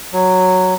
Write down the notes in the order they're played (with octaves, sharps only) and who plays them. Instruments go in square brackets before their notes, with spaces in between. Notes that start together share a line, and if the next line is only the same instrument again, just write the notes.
[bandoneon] F#3